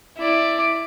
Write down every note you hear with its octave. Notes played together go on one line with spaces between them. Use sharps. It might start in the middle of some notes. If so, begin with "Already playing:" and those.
E4 D5